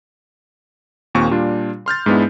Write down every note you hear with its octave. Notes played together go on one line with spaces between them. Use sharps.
D#2 A#2 C4 C#6
A#2 G3 D4 F4
C6 F6 G6 A6
G#2 G#3 B3 D4 E4